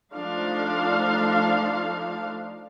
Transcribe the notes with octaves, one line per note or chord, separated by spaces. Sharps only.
F3 A3 D4 D#4 A4 F5